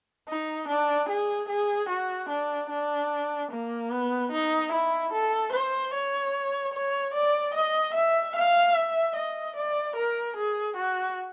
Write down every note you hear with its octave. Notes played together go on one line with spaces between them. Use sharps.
D#4
D4
G#4
G#4
F#4
D4
D4
A#3
B3
D#4
E4
A4
C5
C#5
C#5
D5
D#5
E5
F5
E5
D#5
D5
A#4
G#4
F#4